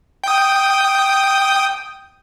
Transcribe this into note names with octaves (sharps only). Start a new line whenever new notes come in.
G5 D#6